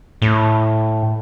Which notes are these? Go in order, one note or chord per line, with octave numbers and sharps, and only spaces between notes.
A2